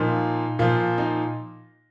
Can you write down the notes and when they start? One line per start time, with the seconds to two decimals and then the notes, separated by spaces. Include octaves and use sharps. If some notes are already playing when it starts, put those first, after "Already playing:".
Already playing: A#2 F3 D#4
0.59 A#2 F3 F4
0.98 D#4